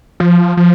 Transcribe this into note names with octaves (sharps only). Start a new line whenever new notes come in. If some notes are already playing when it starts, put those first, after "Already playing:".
F3
F3